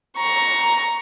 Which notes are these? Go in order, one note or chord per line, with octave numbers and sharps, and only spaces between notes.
A#5 C#6